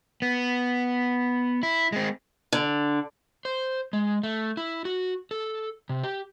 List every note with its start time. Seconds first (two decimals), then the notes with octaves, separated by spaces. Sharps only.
0.22 B3
1.63 E4
1.92 G#3 C4
2.53 D3
3.45 C5
3.93 G#3
4.23 A3
4.57 E4
4.85 F#4
5.31 A4
5.89 C3
6.03 G4